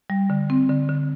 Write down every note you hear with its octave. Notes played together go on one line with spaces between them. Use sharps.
G3
D3
C4
D3
D3